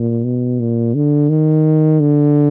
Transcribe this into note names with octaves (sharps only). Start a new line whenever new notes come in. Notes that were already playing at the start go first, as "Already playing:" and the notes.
Already playing: A#2
B2
A#2
D3
D#3
D3